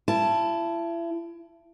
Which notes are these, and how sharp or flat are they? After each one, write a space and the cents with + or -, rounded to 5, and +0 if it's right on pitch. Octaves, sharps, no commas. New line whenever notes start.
E4 +35 A5 +0